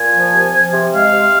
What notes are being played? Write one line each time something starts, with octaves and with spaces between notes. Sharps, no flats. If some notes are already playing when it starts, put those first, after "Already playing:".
Already playing: A#2 G#5
F3
C3
F3
C3
G#3 F5
C3